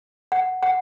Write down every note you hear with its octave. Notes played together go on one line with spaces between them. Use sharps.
F#5
F#5